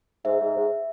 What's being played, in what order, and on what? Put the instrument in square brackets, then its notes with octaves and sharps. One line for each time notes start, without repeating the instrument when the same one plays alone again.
[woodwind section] G#2 [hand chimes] E5
[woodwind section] G#2
G#2